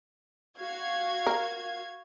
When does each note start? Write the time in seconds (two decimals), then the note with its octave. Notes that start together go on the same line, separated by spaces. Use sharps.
0.59 F#4 F5 G#6
1.27 A#4